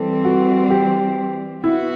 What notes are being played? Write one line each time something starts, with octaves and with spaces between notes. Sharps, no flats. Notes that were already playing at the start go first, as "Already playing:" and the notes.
Already playing: E3 G3 C4 A4
F#4
G4
B3 E4 F#4